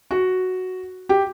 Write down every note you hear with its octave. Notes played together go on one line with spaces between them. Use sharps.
F#4
G4